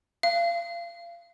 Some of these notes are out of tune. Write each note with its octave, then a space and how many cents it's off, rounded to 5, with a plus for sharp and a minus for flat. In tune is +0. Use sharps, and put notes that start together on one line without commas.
F5 -30